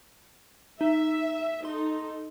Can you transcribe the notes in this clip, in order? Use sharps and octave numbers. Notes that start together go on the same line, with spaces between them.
D#4 E5
D#4 A4 C6